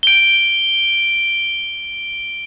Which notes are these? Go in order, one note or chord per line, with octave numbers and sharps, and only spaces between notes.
D7 G7